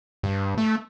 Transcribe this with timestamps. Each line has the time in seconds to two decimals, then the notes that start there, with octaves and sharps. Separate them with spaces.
0.23 G2
0.58 A3